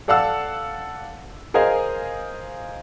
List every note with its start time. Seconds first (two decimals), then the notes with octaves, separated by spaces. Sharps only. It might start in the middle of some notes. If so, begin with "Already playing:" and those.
0.08 A4 D5 F5 F#5 A5 E6
1.54 G#4 A#4 C5 D#5 F5 G#5